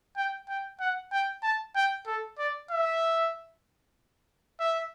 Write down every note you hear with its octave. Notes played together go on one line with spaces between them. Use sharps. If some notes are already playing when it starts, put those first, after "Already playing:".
G5
G5
F#5
G5
A5
G5
A4
D5
E5
E5